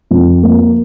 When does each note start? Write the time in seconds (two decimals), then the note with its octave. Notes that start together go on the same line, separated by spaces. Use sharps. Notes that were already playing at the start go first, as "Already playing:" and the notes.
0.11 F2
0.43 A#3